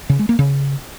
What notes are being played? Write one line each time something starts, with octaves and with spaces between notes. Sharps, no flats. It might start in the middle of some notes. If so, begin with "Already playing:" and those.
C#3
G#3
A#3
C#3